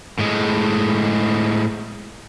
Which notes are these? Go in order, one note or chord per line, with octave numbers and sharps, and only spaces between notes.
A2 G#3